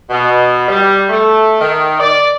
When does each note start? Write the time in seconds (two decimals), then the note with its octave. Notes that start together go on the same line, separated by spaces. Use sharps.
0.10 B2
0.69 G3
1.09 A3
1.61 D#3
2.00 D5